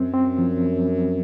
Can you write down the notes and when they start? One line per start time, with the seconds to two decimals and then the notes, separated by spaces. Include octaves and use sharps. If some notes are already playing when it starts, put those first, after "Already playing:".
Already playing: F#2 F#3 C4
0.14 C4
0.38 F3